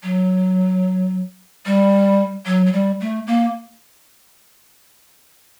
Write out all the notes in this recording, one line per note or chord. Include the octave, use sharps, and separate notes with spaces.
F#3
G3
F#3
F#3
G3
A3
A#3